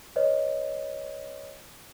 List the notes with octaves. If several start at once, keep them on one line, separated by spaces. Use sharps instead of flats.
B4 C#5 D#5